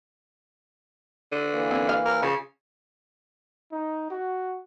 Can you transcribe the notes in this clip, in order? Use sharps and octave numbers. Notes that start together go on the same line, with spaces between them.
D3
E3 A#3
C4 C#4
F5
A#4
C#3 F3
D#4
F#4